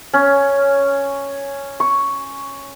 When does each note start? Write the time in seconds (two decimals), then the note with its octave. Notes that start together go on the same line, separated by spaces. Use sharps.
0.13 C#4
1.80 C#6